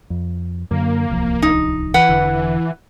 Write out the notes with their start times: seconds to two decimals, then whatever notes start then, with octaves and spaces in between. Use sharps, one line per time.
0.10 F2
0.71 F#2 D3 A#3
1.09 D1 C2 F3
1.42 D#4
1.94 E3 B4 F#5
2.09 E1 D3